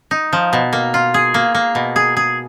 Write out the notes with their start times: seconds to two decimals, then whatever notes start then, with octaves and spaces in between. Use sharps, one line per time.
0.11 D#4
0.33 F3
0.53 B2
0.73 A#3
0.94 F4
1.14 G#4
1.34 A#3
1.55 A#3
1.75 B2
1.96 G#4
2.17 G#4